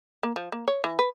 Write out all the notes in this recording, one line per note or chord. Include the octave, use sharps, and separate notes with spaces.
A#3
F3
A#3
C#5
E3
B4